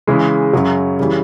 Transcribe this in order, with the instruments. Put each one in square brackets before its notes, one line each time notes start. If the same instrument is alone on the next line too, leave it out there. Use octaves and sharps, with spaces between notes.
[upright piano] C#3 E3 G#3
F#2 C#3 F#3
C#3 E3 G3